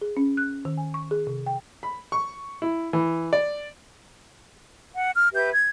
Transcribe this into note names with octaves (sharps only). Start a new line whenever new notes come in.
G#4
C#4
F#6
D#3
G#5
C#6
G#4
C3
G5
B5
C#6
E4
E3
D5
F#5
F6
G4 B4 E5 G6
G#6